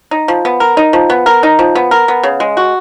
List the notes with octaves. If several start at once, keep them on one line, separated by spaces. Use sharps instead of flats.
D#4
F3
B3
A#4
D#4
F3
B3
A#4
D#4
F3
B3
A#4
B3
C#3
G#3
F#4